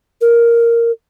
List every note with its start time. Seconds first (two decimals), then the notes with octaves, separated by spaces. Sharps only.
0.21 A#4